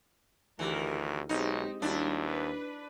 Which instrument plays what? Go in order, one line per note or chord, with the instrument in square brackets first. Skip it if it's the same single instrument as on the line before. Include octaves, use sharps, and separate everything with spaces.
[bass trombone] D2 [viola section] D#3 G4 A#4 [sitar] E3
[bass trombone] B1 [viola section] G#3 C4 G4 [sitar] D#4
[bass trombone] D#2 [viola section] G3 E4 F#4 [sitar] D4
[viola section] B4